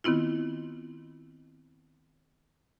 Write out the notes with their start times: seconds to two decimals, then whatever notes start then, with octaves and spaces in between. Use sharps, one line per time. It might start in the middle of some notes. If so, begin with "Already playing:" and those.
0.04 D#3 B3 C4 E4 F4